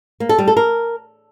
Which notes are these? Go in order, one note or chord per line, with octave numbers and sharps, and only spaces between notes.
A#3
A4
G3
A4
A#4